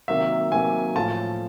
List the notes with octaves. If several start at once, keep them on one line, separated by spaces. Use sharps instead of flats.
C3 D#3 F#3 A#3 E5
C3 D#3 F#3 A#3 G#5
A2 F3 A3 C#4 F4 A5